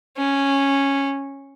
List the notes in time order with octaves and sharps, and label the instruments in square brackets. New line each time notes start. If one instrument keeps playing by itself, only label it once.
[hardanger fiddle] C#4